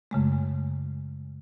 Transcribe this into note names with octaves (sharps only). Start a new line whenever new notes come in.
F#2 C#3 G#3 A3